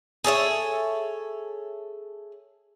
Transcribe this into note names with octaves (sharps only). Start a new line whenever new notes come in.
G#4 A4 C#5 E5